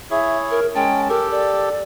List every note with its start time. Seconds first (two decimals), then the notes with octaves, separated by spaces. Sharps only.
0.11 E4 G#4 C#5 E5
0.51 A#4
0.75 G#3 C#4 G5 A5
1.09 G4 A4 A#4
1.31 D5